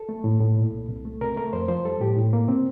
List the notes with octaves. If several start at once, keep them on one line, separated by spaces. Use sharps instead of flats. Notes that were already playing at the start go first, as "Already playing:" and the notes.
Already playing: A4
A3
A2
A2
A#2
C2
C2
A3
C3 A#4
A3 A#4
F2 C5
F3 C5
G3 A4
A2 G4
A2
A#3
C3 C4